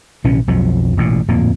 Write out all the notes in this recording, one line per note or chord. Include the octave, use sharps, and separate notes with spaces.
A#1 C3 E3 C#4
B1 F2 F3 F#3
E1 A1 A#2
D1 F2 A#2 A#3